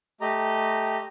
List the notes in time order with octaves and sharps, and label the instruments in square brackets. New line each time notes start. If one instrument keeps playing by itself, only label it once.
[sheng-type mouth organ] A3 G4 D#5 A#5